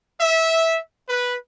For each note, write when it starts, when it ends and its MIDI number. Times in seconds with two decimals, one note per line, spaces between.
0.21 0.80 76
1.09 1.36 71